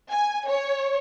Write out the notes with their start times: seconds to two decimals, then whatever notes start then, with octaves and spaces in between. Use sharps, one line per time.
0.11 G#5
0.48 C#5